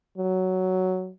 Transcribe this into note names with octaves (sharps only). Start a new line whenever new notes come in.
F#3